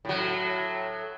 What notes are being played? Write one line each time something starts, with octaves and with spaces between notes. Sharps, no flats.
A2 F#3